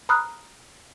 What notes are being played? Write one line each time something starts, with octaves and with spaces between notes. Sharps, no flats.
A#5 B5 D#6 F6 F#6